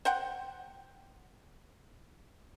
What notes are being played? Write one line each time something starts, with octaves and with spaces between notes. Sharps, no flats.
C5 F#5 G5